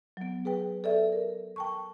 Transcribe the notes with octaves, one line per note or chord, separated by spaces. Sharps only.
F#3 B3
G#4 B4 G5
A4 D5 E5
A#4
G5 A5 C#6